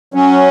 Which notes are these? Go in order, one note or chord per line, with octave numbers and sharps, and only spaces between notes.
F#3 C#4